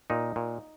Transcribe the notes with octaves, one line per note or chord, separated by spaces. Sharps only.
A#2 D#4
A#2